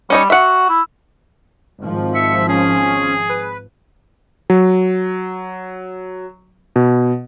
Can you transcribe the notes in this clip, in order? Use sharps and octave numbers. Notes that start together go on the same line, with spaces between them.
G3 C#4 D#4 C#5
F#4 E5 F#5
E4
G#1 F3
E5 C#7
C#4 G#4
B4
F#3
B2